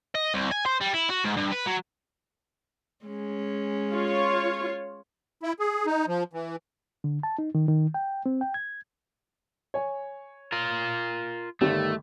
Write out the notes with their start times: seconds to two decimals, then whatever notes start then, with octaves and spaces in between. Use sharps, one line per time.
0.15 D#5
0.34 C2
0.51 G#5
0.66 C5
0.81 G3
0.94 E4
1.10 F#4
1.24 G#2
1.36 G2
1.52 B4
1.66 F#3
3.05 G#3 C#4
3.90 F4 C#5
5.43 E4
5.59 G#4
5.86 D#4
6.08 F3
6.33 E3
7.04 D3
7.23 A5
7.39 D#4
7.55 D#3
7.68 D#3
7.94 G5
8.26 C4
8.41 G5
8.54 G#6
9.74 C#5 G#5
10.52 F4 A#4
11.61 G1 D#3 G3 A3